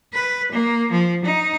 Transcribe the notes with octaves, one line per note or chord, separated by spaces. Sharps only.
B4
A#3
F3
D#4